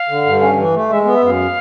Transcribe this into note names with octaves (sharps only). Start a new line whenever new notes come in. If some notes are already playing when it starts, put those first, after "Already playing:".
Already playing: F5
D3
G2
C#4
E3
A3
G#3 E5
B3
E5
F#2 F5